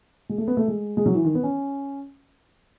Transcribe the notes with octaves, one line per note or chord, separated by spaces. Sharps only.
G#3
A3
B3
A3
G#3
G#3
F#3
E3
D#3
B3
C#4